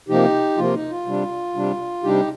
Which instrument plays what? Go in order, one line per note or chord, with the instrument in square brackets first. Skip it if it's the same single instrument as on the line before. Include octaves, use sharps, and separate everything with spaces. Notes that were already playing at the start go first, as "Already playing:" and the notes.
[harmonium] C3 F3 A#3 D#4 G4
C3 F3 A#3 F4
D#4
F4
C3 G3 D4
C3 G3 D4
C3 G3 D4 D#4 G4